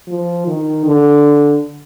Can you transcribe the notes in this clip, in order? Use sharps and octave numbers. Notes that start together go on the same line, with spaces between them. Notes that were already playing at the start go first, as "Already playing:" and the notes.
F3
D#3
D3